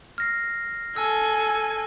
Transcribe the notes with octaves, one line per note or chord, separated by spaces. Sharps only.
F6 A#6 C7
A4 G#5 E6